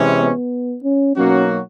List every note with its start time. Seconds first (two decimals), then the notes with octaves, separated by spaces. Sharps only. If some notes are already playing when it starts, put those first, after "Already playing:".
Already playing: C3 E3 G#3 C#4
0.19 B3
0.83 C#4
1.16 B2 F#3 A#3 C#4 D#4 F#4